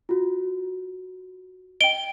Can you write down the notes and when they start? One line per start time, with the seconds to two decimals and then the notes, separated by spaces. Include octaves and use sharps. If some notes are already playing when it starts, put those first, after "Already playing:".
0.09 F4 F#4
1.81 D#5 G5 D7 G7